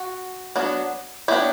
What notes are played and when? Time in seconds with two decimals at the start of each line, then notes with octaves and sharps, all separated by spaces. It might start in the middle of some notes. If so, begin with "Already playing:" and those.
Already playing: F#4
0.56 F#3 B3 D4
1.28 F#3 B3 D4 E4 G4